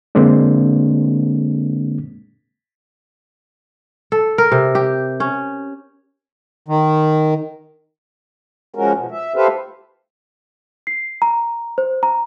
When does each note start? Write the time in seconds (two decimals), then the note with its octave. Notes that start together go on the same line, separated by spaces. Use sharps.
0.15 D3 G#3 A#3 C4 D4
4.12 A4
4.38 A#4
4.52 C3
4.75 G4
5.20 C#4
6.68 D#3
8.75 F3 G#3 C#4 F#4 A#4
8.96 B2 F3
9.11 E5
9.36 G4 A4 B4 C5 E5 F5
10.87 C7
11.22 A#5
11.78 C5
12.03 A#5